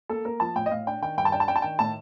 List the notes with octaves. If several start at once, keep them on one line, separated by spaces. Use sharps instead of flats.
A#3 A4
A#3 A#4
F3 A5
A2 G5
D#5
A2 F5
D4 G5
D#3 G5
G2 G5
A5
D4 G5
A5
D4 G5
A5
D#3 G5
A2 A5